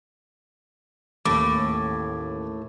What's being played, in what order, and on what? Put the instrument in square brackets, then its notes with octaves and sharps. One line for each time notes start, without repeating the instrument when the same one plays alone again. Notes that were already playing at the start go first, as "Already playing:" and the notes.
[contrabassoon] A1 [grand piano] D#2 [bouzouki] A2 [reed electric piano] D6